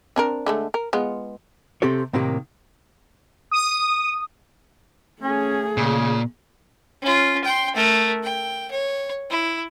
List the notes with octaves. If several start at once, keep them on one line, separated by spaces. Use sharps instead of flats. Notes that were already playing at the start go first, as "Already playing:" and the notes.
C4 D4 A#4
D3 G#3 A3
A#4
G#3 B3 F4
C3 C4 G4 A4 C#5
A2 C3 D#3 A#3 G4
D#6
A3 C#4 G#4
A#2 C#3
C#4 F4
G5 C6
A3 A#4
G5
C#5
E4